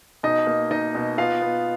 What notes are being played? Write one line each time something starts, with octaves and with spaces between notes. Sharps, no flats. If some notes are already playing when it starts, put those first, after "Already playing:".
B2 D#4 D#5
A#3
A#3 D#4 D#5
B2
B3 F4 F5
B3